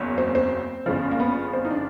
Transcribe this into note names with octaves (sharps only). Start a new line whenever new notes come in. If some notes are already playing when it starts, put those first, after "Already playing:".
Already playing: F#1 E2 C#3 F#3
C4
C4
G1 F#2 C#3 F3
A#3
B3
C4
D#4
D4